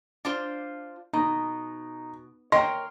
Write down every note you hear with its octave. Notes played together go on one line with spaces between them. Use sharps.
D4 F4 C5
B2 D#4
A#4 C#5 D#5 G5 C6